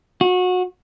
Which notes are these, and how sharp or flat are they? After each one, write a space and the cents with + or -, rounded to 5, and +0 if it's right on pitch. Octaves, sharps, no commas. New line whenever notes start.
F#4 -25